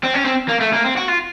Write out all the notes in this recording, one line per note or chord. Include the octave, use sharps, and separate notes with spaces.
C4
C#4
C4
A#3
A3
A#3
C4
F#4
F4